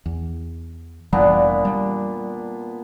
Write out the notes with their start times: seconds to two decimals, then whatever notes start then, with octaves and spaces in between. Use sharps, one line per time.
0.06 E2
1.13 F1 A#2 E3 G3 B3 D4
1.65 G3